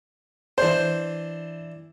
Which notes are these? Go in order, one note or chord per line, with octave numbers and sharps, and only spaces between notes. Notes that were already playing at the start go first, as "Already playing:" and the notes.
E3 D4 C5